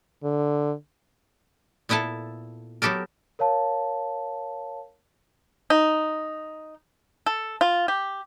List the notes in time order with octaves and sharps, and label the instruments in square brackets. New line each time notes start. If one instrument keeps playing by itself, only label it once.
[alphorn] D3
[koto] A#2 B3 E4 A4 A5
F#3 B3 G4 A4 A#4
[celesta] A#4 C#5 F5 A5
[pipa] D#4
A4
F4
G4